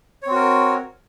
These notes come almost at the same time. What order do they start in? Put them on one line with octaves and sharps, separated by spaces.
C#5 C4 F#4 A#4